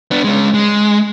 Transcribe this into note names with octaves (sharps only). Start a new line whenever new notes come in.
B3 D4
G#3 C#4
G#3